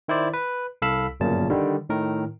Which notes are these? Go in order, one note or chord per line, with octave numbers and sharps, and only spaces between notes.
D#3 E4 C5 D5
B4
C2 A4 F5 B5 E6 B6
G1 F#2 A#2 C#3 A5
D3 D#3 G3
A2 D#3 A#4